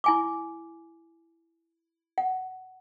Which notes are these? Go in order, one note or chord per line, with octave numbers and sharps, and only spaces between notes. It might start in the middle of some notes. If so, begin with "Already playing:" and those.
E4 G#5 D6
F#5